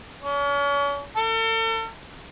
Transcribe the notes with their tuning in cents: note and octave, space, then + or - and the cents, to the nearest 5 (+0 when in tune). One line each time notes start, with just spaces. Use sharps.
C#4 +40
A4 +40